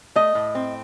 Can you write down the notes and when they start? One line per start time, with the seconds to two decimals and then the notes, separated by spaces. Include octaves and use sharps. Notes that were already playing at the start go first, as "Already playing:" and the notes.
0.15 A3 D#5
0.35 A2
0.55 C4